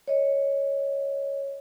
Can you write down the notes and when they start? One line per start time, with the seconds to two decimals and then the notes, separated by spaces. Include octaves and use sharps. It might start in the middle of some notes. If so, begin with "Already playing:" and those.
0.08 C#5 D#5